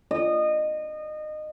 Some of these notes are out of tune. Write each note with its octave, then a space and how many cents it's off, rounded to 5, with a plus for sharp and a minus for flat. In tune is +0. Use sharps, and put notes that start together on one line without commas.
D#5 -25